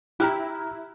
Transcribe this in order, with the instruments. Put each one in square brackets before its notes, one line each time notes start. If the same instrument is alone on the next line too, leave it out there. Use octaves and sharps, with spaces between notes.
[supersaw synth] E4 [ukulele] G4 [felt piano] A#5 F6 F#6